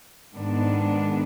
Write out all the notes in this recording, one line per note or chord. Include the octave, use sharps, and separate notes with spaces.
G#2 D#3 G#3 B3 D4